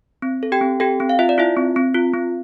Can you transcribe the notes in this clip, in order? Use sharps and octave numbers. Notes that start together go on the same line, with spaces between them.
C4
A4
G4 G5
C4
G4 A4 G5
C4
F5
F4 E5
D5
E4 F4 E5
C4
C4
F4
C4